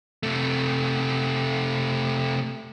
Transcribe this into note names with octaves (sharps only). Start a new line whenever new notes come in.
C3 A3